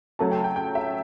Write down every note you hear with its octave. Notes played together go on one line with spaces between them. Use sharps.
C#3 F#3 A3 C#4 A5
G5
G5
G5
E5